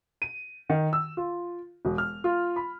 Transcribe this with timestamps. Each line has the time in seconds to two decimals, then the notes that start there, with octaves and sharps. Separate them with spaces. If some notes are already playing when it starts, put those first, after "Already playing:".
0.22 D#7
0.70 D#3
0.93 E6
1.17 F4
1.85 E1
1.98 F6
2.24 F4
2.56 B5